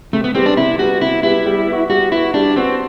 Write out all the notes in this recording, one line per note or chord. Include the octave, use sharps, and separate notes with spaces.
C3 A3
B3
G3 B3 C4
D4
C3 E4
G3 B3 F#4
C3 E4
G3 B3 E4
G3
B3
F#4
G3 F#4
B3 E4 F#4
G3 D4
B3 C4 F#4